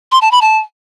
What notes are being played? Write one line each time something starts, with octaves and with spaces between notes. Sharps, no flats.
C6
A5
B5
A5